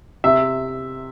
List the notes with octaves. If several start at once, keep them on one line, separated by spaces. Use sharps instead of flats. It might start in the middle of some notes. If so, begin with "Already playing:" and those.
C3 E5